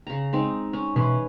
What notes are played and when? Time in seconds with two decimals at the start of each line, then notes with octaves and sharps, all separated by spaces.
0.07 C#3 A#5
0.33 G#3 C4 D#4
0.73 C#4
0.96 B2 E3 C#4 B4 C6